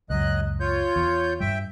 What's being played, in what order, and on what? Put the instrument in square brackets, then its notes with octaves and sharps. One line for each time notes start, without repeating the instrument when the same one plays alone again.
[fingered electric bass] C#2 F#2 [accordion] F#3 D#5 F#6
[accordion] F4 C#5 G6
[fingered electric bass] E2
[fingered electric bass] G2 G3 [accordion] E5 G5